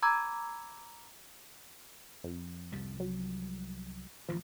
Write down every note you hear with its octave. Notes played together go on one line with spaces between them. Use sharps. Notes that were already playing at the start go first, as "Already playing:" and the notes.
A#5 B5 D6 E6 G#6
F2
C2 F3 G3
F#3
A1 G2 D#3 F3